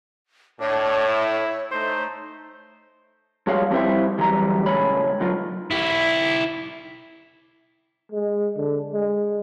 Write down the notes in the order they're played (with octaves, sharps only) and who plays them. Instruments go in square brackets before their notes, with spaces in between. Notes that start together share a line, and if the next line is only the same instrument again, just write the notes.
[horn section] A2 [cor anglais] D4 [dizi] C#5
[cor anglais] E4
[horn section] A3 D#4 [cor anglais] C5
[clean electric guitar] F3 G3 G#3 F#4 C#5 F5
F3 G3 C4 E4 C5 E5
D2 E3 F#3 G3 A#5
C#2 A2 G#3 C#5 B5
B1 D3 F#3 F4
[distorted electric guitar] E4 G4
[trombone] G#3
D3
G#3